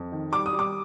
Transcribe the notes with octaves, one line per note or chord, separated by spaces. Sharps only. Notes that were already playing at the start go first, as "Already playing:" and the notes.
Already playing: F2
D#3
G3 D6
D#6
G3
D6